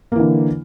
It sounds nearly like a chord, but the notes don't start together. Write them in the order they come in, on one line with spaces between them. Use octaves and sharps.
A#3 E3 D3